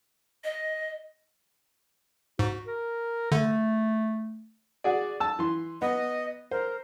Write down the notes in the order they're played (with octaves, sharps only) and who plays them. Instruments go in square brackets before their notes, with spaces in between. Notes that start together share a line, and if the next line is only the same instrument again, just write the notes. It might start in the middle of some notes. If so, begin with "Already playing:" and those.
[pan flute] D#5
[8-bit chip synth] G#2 [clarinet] F#4
[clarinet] A#4
[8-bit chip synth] D3 [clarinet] A3
[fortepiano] F#4 G#4 D5
A5 E6
E3 C6
[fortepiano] B3 [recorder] D#5
[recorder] A#4 [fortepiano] C5